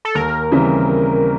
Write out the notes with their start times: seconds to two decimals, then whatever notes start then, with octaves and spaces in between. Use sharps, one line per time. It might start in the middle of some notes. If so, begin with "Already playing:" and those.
0.05 A4
0.15 D#2 A#4
0.52 C#3 E3 G3 C4